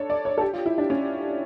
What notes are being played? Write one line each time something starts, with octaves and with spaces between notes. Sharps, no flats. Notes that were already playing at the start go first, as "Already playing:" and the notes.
Already playing: D4 A4 C#5
D5
C#5
A4
G4
F4
E4
D4
C#4